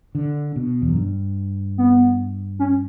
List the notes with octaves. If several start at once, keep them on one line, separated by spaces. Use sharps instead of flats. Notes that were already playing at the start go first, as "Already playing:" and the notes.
D3
B2
E2
F#2
G2
B3
C#4